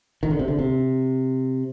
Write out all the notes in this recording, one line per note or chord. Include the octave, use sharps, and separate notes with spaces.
D#3
D3
C3
D3
C3